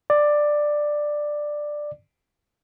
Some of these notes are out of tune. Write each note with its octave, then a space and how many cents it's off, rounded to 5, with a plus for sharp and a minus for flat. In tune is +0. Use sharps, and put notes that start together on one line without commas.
D5 +10